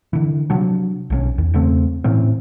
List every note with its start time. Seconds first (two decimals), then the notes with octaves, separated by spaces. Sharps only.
0.13 D3 E3
0.50 C3 F3 F#3 D4
1.10 B1 E3 C#4
1.38 E2 D#3
1.54 E2 C#3 A3 C4
2.04 A2 E3 C4 C#4